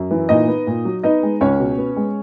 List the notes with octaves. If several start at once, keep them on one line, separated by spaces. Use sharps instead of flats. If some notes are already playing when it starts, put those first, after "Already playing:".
Already playing: F#2
E3
A#2 D#4 D#5
B3
A#2
F#3
B3 D#4 D#5
G#3
C#2 C#4 C#5
B2
B3
G#3